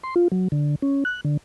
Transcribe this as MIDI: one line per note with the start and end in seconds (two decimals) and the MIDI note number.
0.03 0.14 84
0.16 0.28 65
0.32 0.48 54
0.52 0.75 50
0.82 1.04 61
1.05 1.21 90
1.25 1.37 50